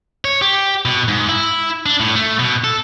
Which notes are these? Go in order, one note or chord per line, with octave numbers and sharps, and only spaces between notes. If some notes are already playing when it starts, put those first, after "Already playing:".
C#5
G4
B2
G#2
E4
D4
A2
A3
B2
A4